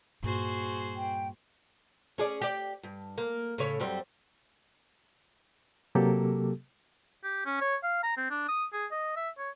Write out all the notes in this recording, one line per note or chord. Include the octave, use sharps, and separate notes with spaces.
G2 A#2 F#4 G#4 C5
G5
C#4 G#4 D5
G4 D5
G2
A#3
A2 C#3 C#5
F#2 G3 C4
C3 F#3 A#3 G4 A4
G4
C#4
C#5
F5
A#5
C4
D4
D#6
G#4
D#5
E5
C#5